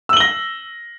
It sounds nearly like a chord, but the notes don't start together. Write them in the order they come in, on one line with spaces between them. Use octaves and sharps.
E6 F#7 G7 A#6